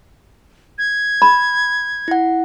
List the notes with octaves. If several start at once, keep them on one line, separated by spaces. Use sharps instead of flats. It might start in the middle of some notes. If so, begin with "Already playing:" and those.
G#6
B5
E4 F#5